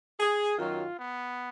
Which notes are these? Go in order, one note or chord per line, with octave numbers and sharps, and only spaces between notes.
G#4
F#2 D#3 F#3 F4
B3